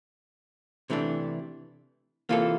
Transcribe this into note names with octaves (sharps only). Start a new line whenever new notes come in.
C3 E3 A3 D4
C3 E3 A#3 F4 A4